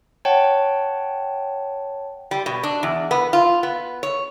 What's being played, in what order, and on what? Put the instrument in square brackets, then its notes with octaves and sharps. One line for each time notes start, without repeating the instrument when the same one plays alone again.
[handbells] C#5 F#5 G5 A5
[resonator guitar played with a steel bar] G3
B2
D4
E2
B3
F4
B3
C#5